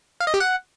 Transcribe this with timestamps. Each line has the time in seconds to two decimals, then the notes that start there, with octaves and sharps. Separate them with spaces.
0.20 F5
0.27 D#5
0.34 G4
0.40 F#5